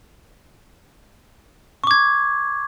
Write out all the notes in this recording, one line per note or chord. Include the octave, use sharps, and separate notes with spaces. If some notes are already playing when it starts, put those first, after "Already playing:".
C#6 D6 G#6